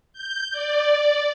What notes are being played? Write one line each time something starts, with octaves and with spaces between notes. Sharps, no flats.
G6
D5